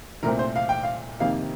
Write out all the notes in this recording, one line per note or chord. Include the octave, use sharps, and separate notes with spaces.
C2 A#2 A3 C4 A#4
C5
F5
G5
F5
F2 C3 D#3 A#3 F5